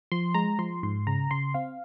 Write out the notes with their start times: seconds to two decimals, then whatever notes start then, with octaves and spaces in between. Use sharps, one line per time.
0.12 F3 C6
0.35 G#3 A#5
0.59 F3 C6
0.83 G#2 C6
1.07 C#3 A#5
1.31 C#3 C6
1.54 C4 F5